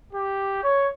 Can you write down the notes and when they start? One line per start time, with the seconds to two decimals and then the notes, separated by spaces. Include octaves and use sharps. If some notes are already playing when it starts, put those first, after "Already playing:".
0.13 G4
0.62 C#5